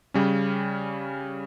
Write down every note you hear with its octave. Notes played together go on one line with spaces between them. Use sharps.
C#3 G3 C#4